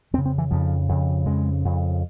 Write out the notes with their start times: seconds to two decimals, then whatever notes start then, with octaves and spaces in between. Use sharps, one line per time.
0.13 F2 C4
0.18 C#3
0.25 C4
0.38 E3
0.51 F2 C#3 F3
0.89 F2 C#3
1.26 F2 C#3 G#3
1.65 F2 C#3